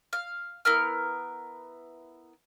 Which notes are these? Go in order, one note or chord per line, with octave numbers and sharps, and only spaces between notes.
F5
B3 E4 A#4 F6